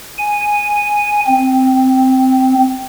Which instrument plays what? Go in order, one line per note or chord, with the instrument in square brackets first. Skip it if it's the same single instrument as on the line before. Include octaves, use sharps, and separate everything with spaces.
[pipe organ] G#5
C4